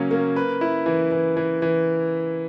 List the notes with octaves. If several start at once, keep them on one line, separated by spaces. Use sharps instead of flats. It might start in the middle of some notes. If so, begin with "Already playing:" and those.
Already playing: C#3 F#3 A#3 C#4
A#3
B4
E4
E3
E3
E3
E3